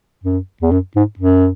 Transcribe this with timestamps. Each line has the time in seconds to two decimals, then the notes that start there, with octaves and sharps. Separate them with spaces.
0.24 F#2
0.62 E2
0.71 F#2
0.96 G#2
1.19 F#2